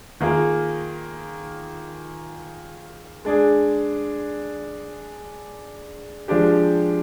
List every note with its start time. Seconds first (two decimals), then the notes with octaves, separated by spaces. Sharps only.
0.20 D#3 A#3 F4 G#4
3.25 G#3 D4 G#4
6.28 F3 G#3 D4 G4